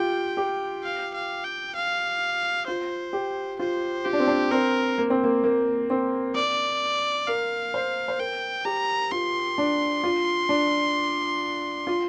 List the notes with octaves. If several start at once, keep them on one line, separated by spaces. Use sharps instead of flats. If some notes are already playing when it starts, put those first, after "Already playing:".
Already playing: F4 G4 G5
G4
F5
F5
G5
F5
F4 C5
G4
F4 C5
F4 G4
D4
C4
D4
C4 A#4
A#3
C4
A#3
A#3
C4
D5
A#4 F5
C5
C5
A#4 G5
G4 A#5
F4 C6
D4
F4
D4
F4